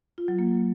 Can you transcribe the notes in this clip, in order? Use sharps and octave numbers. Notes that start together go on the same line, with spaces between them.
F4
F#3
A#3